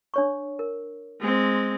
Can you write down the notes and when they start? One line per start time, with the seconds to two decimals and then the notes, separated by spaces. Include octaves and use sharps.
0.14 D4 C#5 C#6
0.59 A#4
1.20 G#3 C4